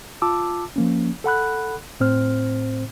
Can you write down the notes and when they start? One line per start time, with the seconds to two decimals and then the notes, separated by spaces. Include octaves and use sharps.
0.22 F4 A5 D6 E6
0.76 F3 A#3 C#4
1.24 A4 F#5 B5 F#6
2.00 A2 C4 C5 F6